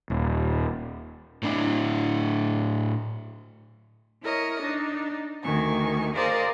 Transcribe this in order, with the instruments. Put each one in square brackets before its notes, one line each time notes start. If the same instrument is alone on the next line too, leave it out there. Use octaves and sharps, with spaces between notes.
[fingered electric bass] D#1
[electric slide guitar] A2 D4 E4
[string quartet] E4 A#4 C#5 D#5
D4 D#4
D2 D#3 G#5 C#6
G#4 A#4 C5 D5 D#5 F5